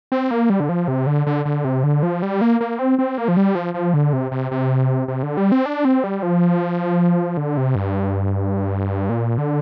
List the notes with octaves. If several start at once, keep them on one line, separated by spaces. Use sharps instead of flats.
C4
A#3
G3
D3
F3
C3
D3
D3
D3
C3
D3
F3
G3
A#3
A#3
C4
C4
A#3
F3
G3
F3
F3
D3
C3
C3
C3
C3
D3
G3
C4
D4
C4
G3
F3
D3
C3
G2
A#2
D3